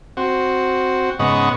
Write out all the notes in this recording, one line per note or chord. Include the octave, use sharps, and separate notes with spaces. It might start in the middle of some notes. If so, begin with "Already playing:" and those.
C4 F#4
G#2 C#3 B3 D#5 F#5 C#6